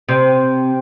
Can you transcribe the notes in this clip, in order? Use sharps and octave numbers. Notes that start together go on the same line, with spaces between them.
C3